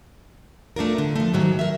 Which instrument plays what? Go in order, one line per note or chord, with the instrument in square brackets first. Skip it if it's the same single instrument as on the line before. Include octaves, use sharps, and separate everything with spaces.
[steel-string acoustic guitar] A3 D4 F4 A#4
D3
F3 A3
G#2 D#3 F#3
A#4 E5